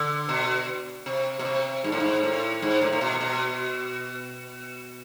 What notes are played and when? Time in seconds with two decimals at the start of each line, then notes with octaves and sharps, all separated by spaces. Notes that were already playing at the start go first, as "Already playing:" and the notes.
Already playing: D3
0.29 B2
1.06 C3
1.39 B2
1.45 C3
1.84 G#2
1.92 A2
2.00 G#2
2.23 A2
2.62 G#2
2.81 A2
2.92 A2
3.01 B2
3.21 B2